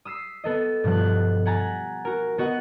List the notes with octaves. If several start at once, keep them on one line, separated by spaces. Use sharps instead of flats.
D#6 E6 B6 C7
B3 A4 D#5
G2 B2 F3 F#6
F#5 G#5 A#5 A6 B6
F#4 A#4
B3 F#4 D#5 F#5